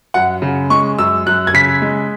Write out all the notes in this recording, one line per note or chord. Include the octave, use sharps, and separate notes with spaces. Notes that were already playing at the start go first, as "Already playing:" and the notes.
F#2 F#5
C#3
G#3 C#6
F#2 E6
F#2 F#6
G#6
C#3 B6
G#3